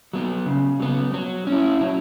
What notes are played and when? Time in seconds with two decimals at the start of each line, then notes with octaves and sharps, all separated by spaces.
0.13 F#3 B3
0.46 C#3
0.80 F#3 B3
1.14 F#3
1.47 C#4
1.52 E4
1.81 F#3